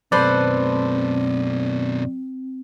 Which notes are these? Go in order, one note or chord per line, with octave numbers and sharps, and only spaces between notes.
F#2 B2 C4 A4 B4 C5 D5